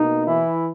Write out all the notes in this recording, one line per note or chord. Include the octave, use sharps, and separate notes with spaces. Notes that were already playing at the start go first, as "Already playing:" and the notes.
Already playing: B2 A#3 D#4
E3 E4